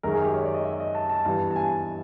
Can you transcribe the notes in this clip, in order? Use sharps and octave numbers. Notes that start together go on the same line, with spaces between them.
F#2 D#3 G#3 A#4
G#4
G4
C#5
D5
D#5
E5
D#5
A5
A5
G2 E3 G3 B3 A5
A5
G#5